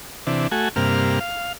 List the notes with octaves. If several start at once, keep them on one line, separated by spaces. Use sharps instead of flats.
C3 E3 D4
A3 F#4 G#5
G2 C3 A#3 F6
F5